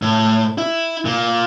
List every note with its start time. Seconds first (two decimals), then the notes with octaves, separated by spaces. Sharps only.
0.02 A2
0.58 E4
1.05 A#2